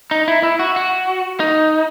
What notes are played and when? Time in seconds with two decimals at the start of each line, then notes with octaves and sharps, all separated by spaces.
0.11 D#4
0.28 E4
0.43 E4
0.59 F#4
0.76 F#4
1.40 D#4